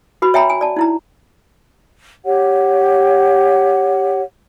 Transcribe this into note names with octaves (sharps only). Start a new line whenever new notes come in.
F#4 B4 B5
C#5 E5 G5 G#5 A#5 B5
G#5
D5 A5
D#4 E4 A#5
G4 C#5 F#5